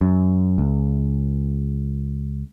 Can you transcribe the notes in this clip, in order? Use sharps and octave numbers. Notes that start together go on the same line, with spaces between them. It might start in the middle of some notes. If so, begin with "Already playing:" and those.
F#2
C#2